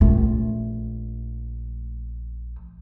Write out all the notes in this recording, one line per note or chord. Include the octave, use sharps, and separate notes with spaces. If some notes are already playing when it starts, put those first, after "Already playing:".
A#1 A3